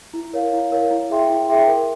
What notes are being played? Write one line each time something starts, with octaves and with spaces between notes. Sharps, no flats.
E4
A#4 C#5 F5
E4
A#4 C#5 F5
E4
G#4 E5 G5 C6
E4
G#4 E5 G5 C6
A#4